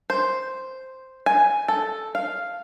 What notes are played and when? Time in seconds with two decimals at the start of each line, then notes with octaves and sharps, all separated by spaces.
0.10 C5
1.26 G#5
1.68 A4
2.15 F5